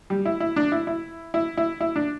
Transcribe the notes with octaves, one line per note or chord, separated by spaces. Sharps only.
G3
E4
E4
D4
E4
E4
E4
E4
E4
D4